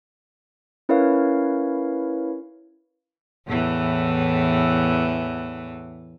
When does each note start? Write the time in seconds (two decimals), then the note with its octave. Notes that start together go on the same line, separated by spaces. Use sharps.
0.89 C#4 E4 A#4 B4 C#5 F5
3.47 E2 A2 E3